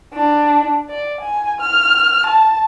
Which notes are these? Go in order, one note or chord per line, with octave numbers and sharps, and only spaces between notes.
D4
D5
G#5
F6
A5